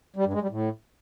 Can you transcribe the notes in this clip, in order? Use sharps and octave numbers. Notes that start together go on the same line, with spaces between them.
G3
G2
G#3
G3
A2